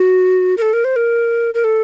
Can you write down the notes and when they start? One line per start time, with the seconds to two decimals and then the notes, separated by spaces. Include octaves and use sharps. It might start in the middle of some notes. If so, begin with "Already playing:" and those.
Already playing: F#4
0.57 A#4
0.62 A4
0.73 A#4
0.84 C5
0.96 A#4
1.54 A#4
1.64 A4